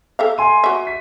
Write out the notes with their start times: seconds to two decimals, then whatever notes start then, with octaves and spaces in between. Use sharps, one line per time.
0.19 A4 E5 F5
0.38 G#5 C6 D#7
0.64 F#4 E5
0.87 B6